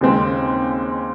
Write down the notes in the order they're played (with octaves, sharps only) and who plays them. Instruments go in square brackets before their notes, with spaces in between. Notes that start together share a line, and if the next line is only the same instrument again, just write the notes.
[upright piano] D#2 C#3 G#3 C4